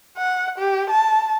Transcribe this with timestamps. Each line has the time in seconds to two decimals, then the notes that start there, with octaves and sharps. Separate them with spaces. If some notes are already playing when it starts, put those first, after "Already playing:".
0.17 F#5
0.59 G4
0.90 A5